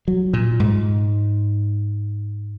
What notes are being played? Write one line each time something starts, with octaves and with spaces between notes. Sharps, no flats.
F#3
A#2
G#2